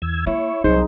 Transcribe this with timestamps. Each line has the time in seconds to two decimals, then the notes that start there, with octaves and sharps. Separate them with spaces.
0.02 E2 E6 G#6
0.27 A#3 E4 C#5
0.64 C2 F#3 D#4 G#4 C5